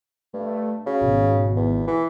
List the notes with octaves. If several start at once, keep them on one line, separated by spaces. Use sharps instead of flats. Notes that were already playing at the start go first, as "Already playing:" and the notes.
G2 A3
C#3 F#4
G#1 B2
E2
E3